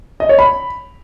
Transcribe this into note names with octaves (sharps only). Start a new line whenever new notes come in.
D#5
C#5
B5